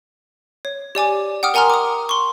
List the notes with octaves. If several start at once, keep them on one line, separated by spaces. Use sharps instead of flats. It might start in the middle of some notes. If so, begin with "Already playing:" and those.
C#5
G4 D5 G#5 D6
F#5 G5 D6 D#6 F6
A#4 F#5 G#5 A#5 C6 F6
D6 D#6
C6 C#6